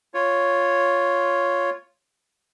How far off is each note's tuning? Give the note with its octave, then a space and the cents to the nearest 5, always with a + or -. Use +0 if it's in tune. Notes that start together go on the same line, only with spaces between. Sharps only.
F4 +0 C#5 +0